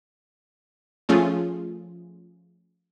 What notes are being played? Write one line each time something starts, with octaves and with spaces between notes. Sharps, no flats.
F3 A3 C#4 F4 G#4